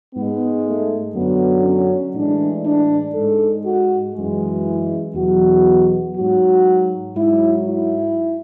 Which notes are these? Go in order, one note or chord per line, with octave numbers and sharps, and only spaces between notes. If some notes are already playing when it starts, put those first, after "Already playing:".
G#2 G#3 B3
A3
F#2 D3 F#3 B3
C#4
A2 E3 G#3 D4
D4
G#2 G#3 A4
F#4
F#2 E3 G#3
E4
E2 B2 F#3 F#4
G#2 F#3 F#4
G#2 F#3 E4
E4